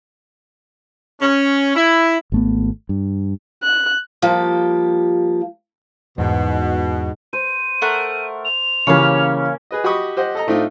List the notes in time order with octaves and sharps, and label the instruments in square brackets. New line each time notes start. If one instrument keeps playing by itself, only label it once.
[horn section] C#4
E4
[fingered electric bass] G#1 A3 B3
G2
[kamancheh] F#6
[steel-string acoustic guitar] F3 G3 A#3 F4 G4
[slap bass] E2 [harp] G#2 [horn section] B2
[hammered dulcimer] C5 [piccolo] D#7
[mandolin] A3 A#4 F#5
[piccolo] F7
[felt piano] C#3 E3 G4 [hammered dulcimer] A#3 C#4 [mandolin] C#5 F5
[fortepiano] G#4 B4 D#5
F#4 G4 D#5 B5 C#6 D#6
G4 C5 D#5 F#5
A4 D#5 A#5
A2 A3 C4 D4 D#4 F4